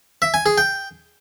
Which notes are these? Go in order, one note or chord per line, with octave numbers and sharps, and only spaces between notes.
E5
G#5
G#4
G5